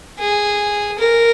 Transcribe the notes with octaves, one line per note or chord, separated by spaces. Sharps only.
G#4
A#4